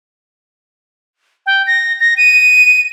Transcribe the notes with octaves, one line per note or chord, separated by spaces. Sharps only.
G5
A#6
A#6
D#7